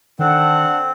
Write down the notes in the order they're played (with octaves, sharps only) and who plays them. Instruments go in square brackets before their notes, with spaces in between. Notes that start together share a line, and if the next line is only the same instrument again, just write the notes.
[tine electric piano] D#3 [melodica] C4 [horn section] D4 A4 F#5